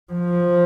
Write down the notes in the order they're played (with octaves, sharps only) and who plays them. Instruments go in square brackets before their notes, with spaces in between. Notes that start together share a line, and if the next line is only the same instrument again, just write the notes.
[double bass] F3